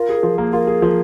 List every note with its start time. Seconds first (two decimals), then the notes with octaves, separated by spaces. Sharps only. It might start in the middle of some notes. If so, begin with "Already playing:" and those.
Already playing: F4 A#4
0.09 G#4
0.23 F3
0.38 A#3
0.53 F4 A#4
0.67 G#4
0.82 F3